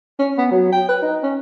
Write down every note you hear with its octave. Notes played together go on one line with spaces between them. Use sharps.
C#4
B3
F#3
G5
B4
D#4
C#4